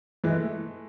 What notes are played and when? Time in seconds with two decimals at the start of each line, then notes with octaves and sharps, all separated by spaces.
0.24 E3 G#3
0.34 A3